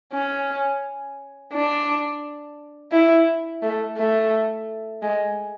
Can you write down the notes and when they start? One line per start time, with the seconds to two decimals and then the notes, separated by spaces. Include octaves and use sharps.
0.13 C#4
1.53 D4
2.92 E4
3.62 A3
3.98 A3
5.02 G#3